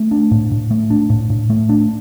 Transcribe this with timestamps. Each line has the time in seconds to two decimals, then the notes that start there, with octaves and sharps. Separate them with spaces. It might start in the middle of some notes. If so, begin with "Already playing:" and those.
Already playing: A3
0.11 D4
0.31 A2
0.51 A2
0.71 A3
0.90 D4
1.10 A2
1.30 A2
1.50 A3
1.69 D4